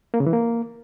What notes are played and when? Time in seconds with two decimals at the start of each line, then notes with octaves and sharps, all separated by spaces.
0.14 A#3
0.20 C#3
0.27 E3
0.33 A#3